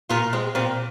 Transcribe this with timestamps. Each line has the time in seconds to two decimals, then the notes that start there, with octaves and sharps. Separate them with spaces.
0.10 A#2 F4 A#4
0.33 G#3 C4
0.55 A#2 C4